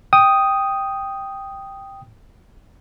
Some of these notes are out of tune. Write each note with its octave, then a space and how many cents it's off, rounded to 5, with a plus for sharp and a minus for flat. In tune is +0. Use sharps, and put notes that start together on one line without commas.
G5 +0 D#6 +0